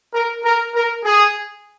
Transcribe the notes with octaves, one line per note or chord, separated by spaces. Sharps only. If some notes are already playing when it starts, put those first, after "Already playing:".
A#4
A#4
A#4
G#4